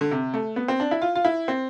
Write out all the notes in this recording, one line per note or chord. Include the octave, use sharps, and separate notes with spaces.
D3
C3
A3
B3
C4
D4
E4
F4
F4
E4
C4